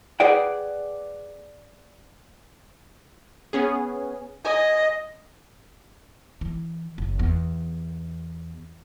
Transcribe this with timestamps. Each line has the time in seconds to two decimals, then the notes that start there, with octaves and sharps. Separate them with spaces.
0.20 G#4 B4 D5 F#5 G5
3.53 B3 C#4 G#4
4.45 D#5 G#5
6.41 E3
6.98 F#1
7.19 E2